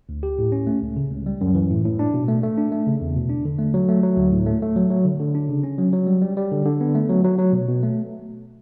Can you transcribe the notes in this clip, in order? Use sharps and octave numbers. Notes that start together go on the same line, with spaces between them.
D2
G4
A2
C#4
A3
C#2
C#3
C#2
G3
F#2
E3
A2
A2
D4
B2
A3
A3
D4
A3
C#3
E2
B2
D4
D3
A3
F#3
A3
F#3
D2
A2
A3
A3
F#3
F#3
D3
D3
D4
C#3
C#4
F#3
F#3
G3
G3
G3
D3
D3
B3
A3
F#3
F#3
F#3
B2
B2
A3